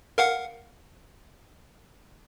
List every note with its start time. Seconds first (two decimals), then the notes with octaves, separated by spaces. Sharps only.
0.18 A#4 F5 F#5